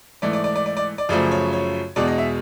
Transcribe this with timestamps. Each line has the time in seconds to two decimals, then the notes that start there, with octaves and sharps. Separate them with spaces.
0.22 G#2 E3 A3 D5
0.33 D5
0.44 D5
0.56 D5
0.66 D5
0.77 D5
0.98 D5
1.09 F#2 C#3 F3 A3 D5
1.31 C#5
1.53 C#5
1.96 E2 B2 G#3 D5
2.07 D#5
2.18 E5